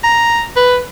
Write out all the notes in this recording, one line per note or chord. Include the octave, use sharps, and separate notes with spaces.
A#5
B4